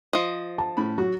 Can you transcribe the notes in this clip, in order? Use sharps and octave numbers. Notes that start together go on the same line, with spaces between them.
F3 D#5
A5
A2 C#4 B5
F#3 F#4